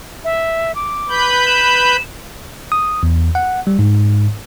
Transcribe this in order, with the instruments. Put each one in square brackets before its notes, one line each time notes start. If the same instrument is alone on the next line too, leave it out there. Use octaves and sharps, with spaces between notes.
[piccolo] E5
D6
[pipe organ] B4 B5 G6
[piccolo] E7
[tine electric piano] D#6
E2
F#5
G3
G#2